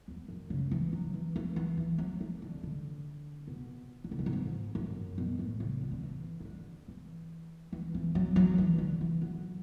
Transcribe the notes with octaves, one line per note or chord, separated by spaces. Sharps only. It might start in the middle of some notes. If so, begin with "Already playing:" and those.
E2
F#2
C#3
E3
F#3
E3
E3
E3
E3
F#3
E3
D3
D3
B2
D3
C#3
B2
A2
G#2
F#2
B2
A2
C#3
D3
D3
E3
E3
D3
E3
E3
E3
F#3
F#3
E3
D3
E3
F#3